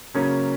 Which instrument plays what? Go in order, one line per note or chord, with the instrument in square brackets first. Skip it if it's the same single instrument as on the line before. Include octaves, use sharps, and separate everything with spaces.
[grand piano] C#3 F#3 A#3 C#4